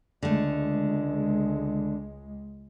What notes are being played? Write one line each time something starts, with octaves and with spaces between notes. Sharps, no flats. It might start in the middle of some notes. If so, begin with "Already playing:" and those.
C#2 D3 G#3 A3